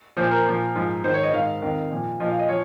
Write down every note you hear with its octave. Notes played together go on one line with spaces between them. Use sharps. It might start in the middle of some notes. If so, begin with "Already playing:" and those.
A#2 F3 C5
A#4
A#2 F3
G#2 F3
G#2 D#3 C5
C#5
D#5
G#2 D#3 F5
F2 D#3
A#2 F3
A#2 F3 D#5
F5
D#5
F3 C#5